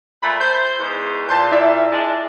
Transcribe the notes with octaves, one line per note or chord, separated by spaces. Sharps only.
A#2 A3 B5
C5 G6
E2 G#2
A#2 A5 C6 G6
E4 D5 E5
G#3 D4